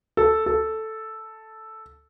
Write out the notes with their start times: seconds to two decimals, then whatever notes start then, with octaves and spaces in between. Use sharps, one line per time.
0.17 A4
0.46 A4